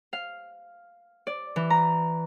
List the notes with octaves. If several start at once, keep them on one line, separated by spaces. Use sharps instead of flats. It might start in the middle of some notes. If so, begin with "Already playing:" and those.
F5
D5
E3
A#5